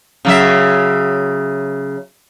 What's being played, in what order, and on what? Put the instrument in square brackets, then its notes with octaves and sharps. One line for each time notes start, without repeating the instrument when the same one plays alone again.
[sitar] C#3 F#3 E5